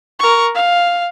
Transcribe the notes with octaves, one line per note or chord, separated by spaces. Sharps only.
A#4 C#6
F5